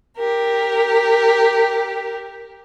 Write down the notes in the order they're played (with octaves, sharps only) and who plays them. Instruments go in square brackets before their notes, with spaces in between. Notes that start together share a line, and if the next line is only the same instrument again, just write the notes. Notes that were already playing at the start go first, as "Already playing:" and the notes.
[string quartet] G4 A#4